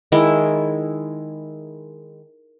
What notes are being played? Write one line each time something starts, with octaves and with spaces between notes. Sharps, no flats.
D#3 G#3 E4